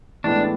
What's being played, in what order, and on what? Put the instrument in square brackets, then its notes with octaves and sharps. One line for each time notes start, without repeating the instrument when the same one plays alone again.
[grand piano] A2 E3 G#3 B3 [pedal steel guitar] D4